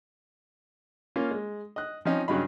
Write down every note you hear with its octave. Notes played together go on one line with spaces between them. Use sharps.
A#3 C#4 F4
G#3
D#5 F#6
F3 C4 C#4 D#4
G2 C#3 F#3 D#4 B5